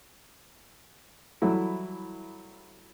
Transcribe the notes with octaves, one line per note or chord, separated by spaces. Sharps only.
E3 F#3 G3 E4 A4